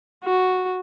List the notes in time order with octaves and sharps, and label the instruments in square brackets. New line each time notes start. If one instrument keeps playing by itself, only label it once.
[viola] F#4